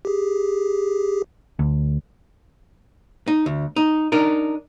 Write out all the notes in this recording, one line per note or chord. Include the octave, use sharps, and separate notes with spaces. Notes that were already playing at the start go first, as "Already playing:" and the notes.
G4 G#4
D2
D#4
D2
D#4
D4 D#4 A#4